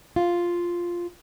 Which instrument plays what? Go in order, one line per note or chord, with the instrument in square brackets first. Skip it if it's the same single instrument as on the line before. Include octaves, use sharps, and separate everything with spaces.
[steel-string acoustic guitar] F4